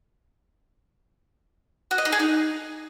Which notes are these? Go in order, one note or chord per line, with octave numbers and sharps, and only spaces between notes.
F#4
D#5
D#4
G#4
D#4